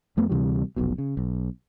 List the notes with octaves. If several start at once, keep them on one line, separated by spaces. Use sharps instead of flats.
F2 A3 B3
D2 C3 E3 G3
F1 B1 B2
C#3
B1